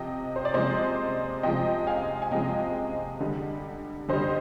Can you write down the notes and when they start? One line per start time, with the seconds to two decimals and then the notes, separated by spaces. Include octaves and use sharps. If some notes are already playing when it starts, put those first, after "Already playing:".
Already playing: C3 F3 D#5 G5
0.36 C5
0.45 D5
0.54 C3 F3 G#3 C5 D#5
1.43 C3 F3 G#3 D#5 G5
1.87 F5 G#5
2.22 G#5
2.31 C3 F3 G#3 D#5 G5
3.20 D3 G3
4.08 D3 G3 C5 D#5